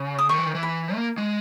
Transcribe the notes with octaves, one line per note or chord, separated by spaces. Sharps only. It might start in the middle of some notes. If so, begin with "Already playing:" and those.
Already playing: C#3
D#6
D#3 C#6
E3
D#3
E3
B5
A#3
G#3